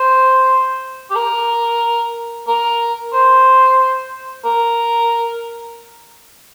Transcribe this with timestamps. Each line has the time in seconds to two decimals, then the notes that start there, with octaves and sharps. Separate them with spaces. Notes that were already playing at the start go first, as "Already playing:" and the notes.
Already playing: C5
1.11 G4
1.16 A#4
2.47 A#4
3.13 C5
4.45 A#4